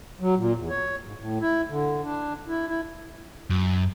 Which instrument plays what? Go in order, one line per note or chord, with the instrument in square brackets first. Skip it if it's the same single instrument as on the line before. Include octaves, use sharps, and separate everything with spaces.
[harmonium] F#3
A#2
E2
C#5
G#2
A2
E4
D3
D4
E4
E4
[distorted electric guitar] F#2